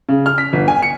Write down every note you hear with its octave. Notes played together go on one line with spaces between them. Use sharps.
C#3
F6
B6
G1
G#5
C#7